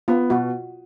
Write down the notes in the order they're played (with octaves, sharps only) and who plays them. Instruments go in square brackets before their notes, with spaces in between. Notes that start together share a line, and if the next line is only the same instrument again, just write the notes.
[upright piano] B3 [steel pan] F4
[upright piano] B2 [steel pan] F#4